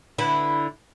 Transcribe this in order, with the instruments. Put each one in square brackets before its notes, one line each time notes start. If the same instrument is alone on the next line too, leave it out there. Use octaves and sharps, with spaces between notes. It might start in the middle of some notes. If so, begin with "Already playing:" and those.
[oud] D3 E4 B4